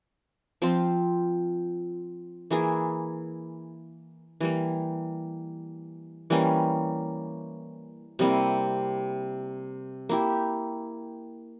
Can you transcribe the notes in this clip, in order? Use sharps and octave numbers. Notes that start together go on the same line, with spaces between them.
F3 C4 F4
E3 A#3 E4 G#4
E3 G3 A#3
E3 G3 A#3 C#4
C3 G3 A#3 E4
A#3 E4 G4